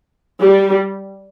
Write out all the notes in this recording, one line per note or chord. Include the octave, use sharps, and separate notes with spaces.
G3